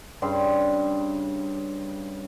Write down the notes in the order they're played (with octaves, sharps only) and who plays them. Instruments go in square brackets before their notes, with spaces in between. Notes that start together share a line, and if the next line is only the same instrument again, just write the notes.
[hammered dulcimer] G2 C#3 G5 C6